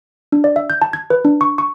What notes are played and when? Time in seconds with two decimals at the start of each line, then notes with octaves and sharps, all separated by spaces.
0.32 D4
0.44 D5
0.56 E5
0.70 G6
0.82 A5
0.93 G#6
1.10 B4
1.25 D4
1.41 C#6
1.58 C#6